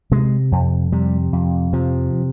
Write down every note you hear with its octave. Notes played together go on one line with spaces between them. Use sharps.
C3 G#3
F2
C3 G3
F2
C3 F3